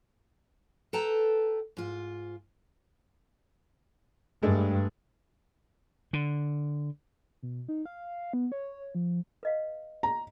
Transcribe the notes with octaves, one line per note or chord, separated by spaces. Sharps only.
A4 B4 G5 A5 A#5
G#2 F4
G2 G#3 A3 D4
D3
B2
D#4
F5
B3
C#5
F3
B4 D#5 F5
A#5